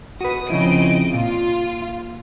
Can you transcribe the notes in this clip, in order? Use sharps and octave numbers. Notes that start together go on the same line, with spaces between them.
F#4 B4 D#6
C#3 F3 C4 E4 D#5 D7
A#2 F4